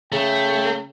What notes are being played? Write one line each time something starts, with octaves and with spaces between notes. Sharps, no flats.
C#3 A3 G5